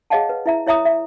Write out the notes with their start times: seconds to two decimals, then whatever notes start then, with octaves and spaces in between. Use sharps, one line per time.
0.10 G#4 C#5 D#5 F5 F#5 A5
0.29 B4
0.46 E4 E5 A#5
0.66 E4 C#5 E5 A#5 D#6
0.85 E5